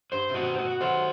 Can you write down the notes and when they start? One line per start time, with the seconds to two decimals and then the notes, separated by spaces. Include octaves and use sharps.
0.12 G2 C5
0.30 C3
0.35 B2 F#4
0.58 B2 F#4
0.71 B3
0.81 F#3 A3 C5